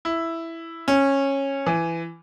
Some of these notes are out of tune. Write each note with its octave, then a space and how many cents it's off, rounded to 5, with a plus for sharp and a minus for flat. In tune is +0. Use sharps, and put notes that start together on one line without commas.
E4 +5
C#4 -15
E3 +15